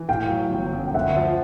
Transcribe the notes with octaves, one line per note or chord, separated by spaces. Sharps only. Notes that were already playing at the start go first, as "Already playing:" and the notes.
Already playing: E3
A2 F5 G5
F#3
G1
F#2
G5
D2 E5 F#5
F3